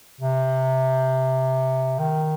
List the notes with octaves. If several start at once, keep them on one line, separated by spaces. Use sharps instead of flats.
C3
D#3